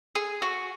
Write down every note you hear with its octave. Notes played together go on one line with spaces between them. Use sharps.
G#4
F#4